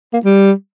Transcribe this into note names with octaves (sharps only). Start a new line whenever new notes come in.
A#3
G3